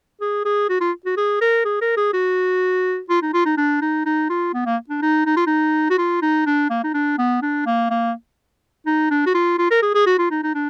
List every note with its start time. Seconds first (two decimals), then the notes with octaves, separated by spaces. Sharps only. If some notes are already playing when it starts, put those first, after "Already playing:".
0.21 G#4
0.45 G#4
0.69 F#4
0.80 F4
1.05 F#4
1.17 G#4
1.41 A#4
1.65 G#4
1.81 A#4
1.97 G#4
2.13 F#4
3.09 F4
3.22 D#4
3.33 F4
3.45 D#4
3.57 D4
3.81 D#4
4.05 D#4
4.29 F4
4.53 B3
4.66 A#3
4.89 D4
5.02 D#4
5.26 D#4
5.36 F4
5.46 D#4
5.90 F#4
5.98 F4
6.22 D#4
6.46 D4
6.70 A#3
6.83 D#4
6.94 D4
7.18 B3
7.42 D4
7.66 A#3
7.90 A#3
8.86 D#4
9.10 D4
9.26 F#4
9.34 F4
9.58 F4
9.70 A#4
9.82 G#4
9.94 G#4
10.06 F#4
10.18 F4
10.30 D#4
10.43 D#4
10.54 D4